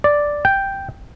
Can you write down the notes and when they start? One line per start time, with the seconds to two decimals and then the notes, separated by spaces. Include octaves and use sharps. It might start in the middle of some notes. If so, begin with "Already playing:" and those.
0.04 D5
0.45 G5